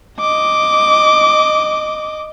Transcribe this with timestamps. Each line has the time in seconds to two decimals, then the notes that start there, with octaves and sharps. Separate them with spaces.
0.20 D#5 D6